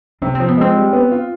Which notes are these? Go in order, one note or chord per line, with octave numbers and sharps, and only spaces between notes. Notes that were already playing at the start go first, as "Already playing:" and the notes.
C3 D4
C4
F3
B3
G#3 C4
G3
B3
F4